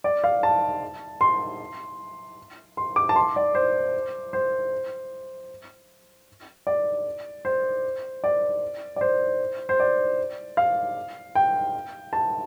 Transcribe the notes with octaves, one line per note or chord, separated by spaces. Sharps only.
D5
F5
A5
C6
C6
D6
A5
C6
D5
C5
C5
D5
C5
D5
D5
C5
C5
D5
F5
G5
A5